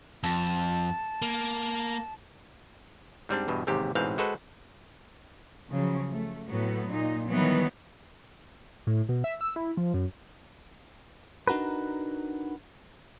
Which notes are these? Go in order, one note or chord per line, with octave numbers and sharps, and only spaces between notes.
F2 A5
A#3
G#2 G3 C4 D4
E2 G2 B2
A1 D#2 G#2 C3 G4
A1 G#2 B2 E3 C4 F5
G#3 F#4 A4 B4 C5
C#3 F3 F#3
A3
A2 F#3 B3
A#2 D#4
D#3 E3 F#3 G3 B3
A2
B2
E5
E6
E4
F3
F#2
D4 D#4 F#4 A#4 B4